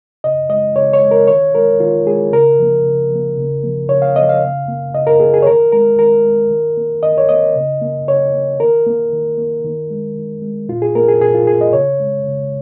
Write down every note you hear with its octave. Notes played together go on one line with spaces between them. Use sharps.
C#3 D#5
G#3 D#5
C#3 C#5
C#5
G#3
A#4
D#3 C#5
G#3 A#4
D#3 F4
G#3 G#4
C#3 A#4
F3 A#3
C#3
F3 A#3
C#3
F3 A#3
C#3 C#5
F5
F3 A#3 D#5
F5
C#3
A#3
C#3 D#5
A#4
A#3 G#4
G#4
C#5
D#3 A#4
G#3 A#4
D#3 A#4
G#3
D#3
A#3
D#3 D#5
C#5
A#3 D#5
C#3
A#3
C#3 C#5
A#3
D#3 A#4
A#3
D#3
A#3
D#3
G#3
D#3
G#3
A#2 F4
G#4
A#3 A#4
G#4
A#2 G#4
F4
A#3 G#4
D#5
C#3 C#5
G#3
C#3